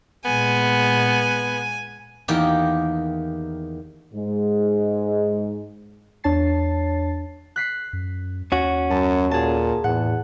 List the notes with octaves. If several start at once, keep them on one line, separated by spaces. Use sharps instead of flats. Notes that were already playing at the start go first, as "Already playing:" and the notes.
A#2 G#3 B3 G#5
E2 D#3 A#3 G4 G5
G#2 G#3
E2 D4 C#5 A5 A6 C7
F#6 B6 C7
F#2
D#2 C#4 F#4
F#2 A5
A#2 G#4 A5
E2 A2 F#5